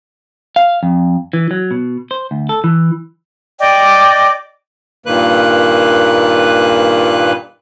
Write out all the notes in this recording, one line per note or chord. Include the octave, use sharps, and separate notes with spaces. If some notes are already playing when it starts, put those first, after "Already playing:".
F5
F2
E3
F#3
B2
C5
D2
A4
E3
D5 D#5 G5 D6
G2 A#2 D#3 A#3 B4 F#6